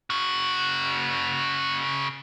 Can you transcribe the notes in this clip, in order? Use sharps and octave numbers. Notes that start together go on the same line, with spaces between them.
C#3 F#4